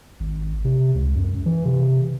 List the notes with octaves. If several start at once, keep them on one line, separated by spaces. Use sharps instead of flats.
G#1
C3
C#2
F#2
E3
C3